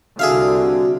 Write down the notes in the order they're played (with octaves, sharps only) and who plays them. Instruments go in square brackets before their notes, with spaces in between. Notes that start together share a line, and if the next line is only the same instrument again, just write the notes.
[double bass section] C2 D3 [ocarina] F#4 [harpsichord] G#4 E5 F5